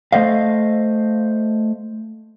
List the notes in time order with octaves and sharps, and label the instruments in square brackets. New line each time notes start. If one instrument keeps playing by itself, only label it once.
[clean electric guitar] A3 C5 D#5 F5